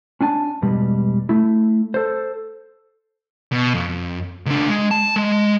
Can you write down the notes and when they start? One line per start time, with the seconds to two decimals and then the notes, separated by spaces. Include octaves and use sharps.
0.21 C#4 D4 G#5 A5
0.62 E2 G2 B2 G3 G#3
1.29 A3 E4
1.94 A4 C5
3.52 B2
3.74 F2
4.46 C#2 D4
4.69 G#3
4.91 A5
5.16 G#3